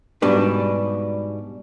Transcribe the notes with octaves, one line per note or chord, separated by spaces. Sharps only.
G#2 B2 G3 D4 B4